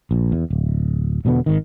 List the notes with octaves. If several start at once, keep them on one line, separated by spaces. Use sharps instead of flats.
A#1
E2
D1
E1 B2 D3 B3
G#1 D#3